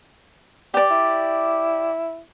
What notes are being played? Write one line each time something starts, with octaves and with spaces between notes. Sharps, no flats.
G3 G4 D5
E4